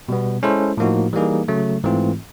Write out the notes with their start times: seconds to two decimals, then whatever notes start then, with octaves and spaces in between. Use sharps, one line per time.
0.09 B2 G3 B3
0.43 G#3 C#4 E4 A4 C5
0.77 A2 F3 A#3 D#4 F#4
1.13 E3 G3 A#3 D#4 G#4
1.48 C#3 F#3 A3
1.84 G#2 E3 A3 C4 F4